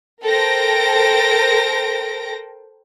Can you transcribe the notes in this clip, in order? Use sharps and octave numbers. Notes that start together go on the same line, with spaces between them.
A4 A#4 C5 G5 A#6 D7